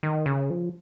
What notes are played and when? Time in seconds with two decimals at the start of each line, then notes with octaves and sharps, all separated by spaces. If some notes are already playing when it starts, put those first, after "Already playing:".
0.03 D#3
0.26 C#3
0.50 F3